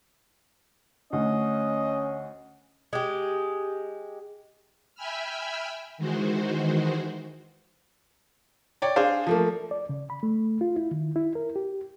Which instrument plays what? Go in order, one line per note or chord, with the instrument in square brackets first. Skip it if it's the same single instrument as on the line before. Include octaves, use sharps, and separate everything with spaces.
[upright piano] D2 [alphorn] C#4 [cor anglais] D#5
[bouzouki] G#3 G4
[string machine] E5 G5 G#5 B5 E6 F6
D#3 E3 G#3 F#4 C5
[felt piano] C#5 D5 G5
D4 G#4 C5 F5
F3 A3 A#3
[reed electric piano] D5
C#3
B5
A3
F4
E4
D#3
E4
A#4
G4